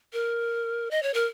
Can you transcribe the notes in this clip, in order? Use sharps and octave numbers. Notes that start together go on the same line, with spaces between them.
A#4
D#5
C#5
A#4